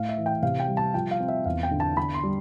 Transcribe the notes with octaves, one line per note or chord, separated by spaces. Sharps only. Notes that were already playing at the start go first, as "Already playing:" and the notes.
Already playing: A2 F5
E5
E3
G5
C3 F5
G5
G3
A5
F3 G5
F5
C4
E5
E2 F5
G5
D3
A5
D3 B5
C6
G3